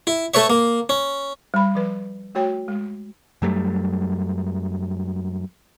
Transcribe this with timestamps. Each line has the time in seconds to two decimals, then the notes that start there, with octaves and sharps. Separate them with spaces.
0.07 E4
0.34 A3 A4 B4 C#5 E5
0.50 A#3
0.89 C#4
1.54 G3 B5
1.75 F3 B4
2.35 A3 F#4 C#5 G5
2.68 G#3
3.42 F#2 F#3 G3 A3